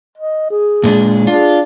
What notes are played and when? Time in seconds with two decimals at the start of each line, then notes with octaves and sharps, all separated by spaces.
0.18 D#5
0.50 G#4
0.84 A#2 G#3 D4
1.27 D4 F4 G#4